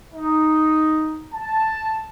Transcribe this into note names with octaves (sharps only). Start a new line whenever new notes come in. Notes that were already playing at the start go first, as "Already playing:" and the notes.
D#4
A5